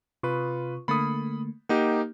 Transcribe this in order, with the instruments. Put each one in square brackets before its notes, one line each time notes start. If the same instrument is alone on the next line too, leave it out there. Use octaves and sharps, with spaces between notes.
[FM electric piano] C3 C#6 [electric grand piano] F4 B4
[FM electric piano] D3 A3 A#3 [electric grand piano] B5 D#6
[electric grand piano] A#3 D#4 G4 [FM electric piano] F#5